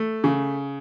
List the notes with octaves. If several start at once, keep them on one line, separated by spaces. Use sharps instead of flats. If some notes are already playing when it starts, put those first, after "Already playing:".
Already playing: A3
C#3